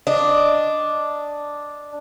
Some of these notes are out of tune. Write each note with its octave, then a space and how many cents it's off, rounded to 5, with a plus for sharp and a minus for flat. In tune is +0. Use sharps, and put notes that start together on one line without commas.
D4 +0 D#5 -5